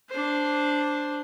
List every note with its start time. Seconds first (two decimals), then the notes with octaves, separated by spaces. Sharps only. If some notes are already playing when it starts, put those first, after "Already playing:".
0.10 D4 C5